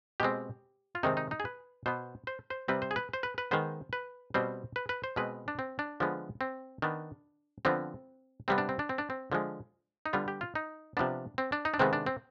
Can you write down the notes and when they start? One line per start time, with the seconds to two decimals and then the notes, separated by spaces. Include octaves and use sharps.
0.20 B2 G#3 C4 G4
0.95 F4
1.03 C3 D#3 G#3 C4 D#4
1.17 D#4
1.31 D#4
1.40 G#4
1.45 B4
1.86 B2 B3 C5
2.27 C5
2.50 C5
2.68 C3 G3 C4 B4
2.82 C5
2.91 G#4
2.96 B4
3.13 C5
3.23 B4
3.38 B4
3.51 D#3 G#3 B3 C5
3.93 B4
4.34 B2 G3 C4 C5
4.76 B4
4.89 B4
5.04 C5
5.16 B2 G#3 C4 B4
5.48 D4
5.59 C4
5.79 D4
6.00 D3 F3 G#3 B3
6.41 C4
6.82 D#3 B3 D4
7.65 D3 F3 B3 C4
8.48 C3 G3 B3 C4
8.58 D4
8.69 C4
8.79 D4
8.89 C4
8.98 D4
9.10 C4
9.32 D3 F3 G#3
10.06 D#4
10.13 D3 G3 B3 F4
10.28 G4
10.41 F4
10.55 D#4
10.97 C3 F3 B3 D4
11.38 C4
11.52 D4
11.65 D#4
11.74 D4
11.79 C3 D#3 G#3 B3 C4
11.93 D4
12.07 C4